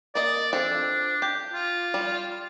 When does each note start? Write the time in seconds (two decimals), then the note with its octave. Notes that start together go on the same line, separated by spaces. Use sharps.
0.15 A#3 D5 D#5
0.53 F3 C4 D4 A4
1.22 G4
1.52 F4
1.94 G3